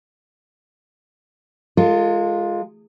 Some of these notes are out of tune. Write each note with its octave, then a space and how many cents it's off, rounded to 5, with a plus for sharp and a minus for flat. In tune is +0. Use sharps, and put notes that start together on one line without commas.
G#3 +0 F4 +0 A4 +45